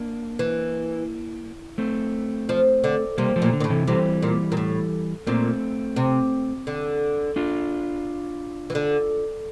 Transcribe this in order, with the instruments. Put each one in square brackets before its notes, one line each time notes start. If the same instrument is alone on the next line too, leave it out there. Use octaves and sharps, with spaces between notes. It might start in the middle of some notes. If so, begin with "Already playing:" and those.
Already playing: [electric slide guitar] A#3 D4
[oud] E3
[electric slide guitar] A3 C4
[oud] F3
D3
[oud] C3 [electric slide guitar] G3 A#3
[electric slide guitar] F3 A3
[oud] A#2
[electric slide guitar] D3
[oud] A#2
A2
[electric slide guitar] C3 E3
[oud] C3 [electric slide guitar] E3 G3
[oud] A#2
A#2
A2
[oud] A#2 [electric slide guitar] A3 C4
[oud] C3
D3
[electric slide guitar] D4 F4
[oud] E3
D3